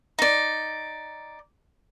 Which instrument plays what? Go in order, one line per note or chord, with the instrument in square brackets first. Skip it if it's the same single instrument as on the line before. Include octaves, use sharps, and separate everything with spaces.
[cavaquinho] D#4 D5